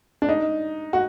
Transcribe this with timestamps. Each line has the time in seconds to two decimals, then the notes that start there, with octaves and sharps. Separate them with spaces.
0.22 D4
0.29 D#4
0.93 F#4